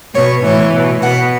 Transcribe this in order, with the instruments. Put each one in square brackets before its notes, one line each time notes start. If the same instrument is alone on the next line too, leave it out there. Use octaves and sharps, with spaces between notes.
[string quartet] B2 C#5
A2 E3 C#5
B2
B2 F#5